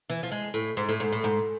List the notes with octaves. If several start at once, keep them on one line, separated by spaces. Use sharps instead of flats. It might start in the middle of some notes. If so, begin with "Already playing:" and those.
E3
F3
G#3
A2
G#2
A2
G#2
A2
G#2